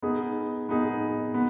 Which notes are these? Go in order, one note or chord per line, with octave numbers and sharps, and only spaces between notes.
B3 D#4 G#4
B3 D#4 G#4
B3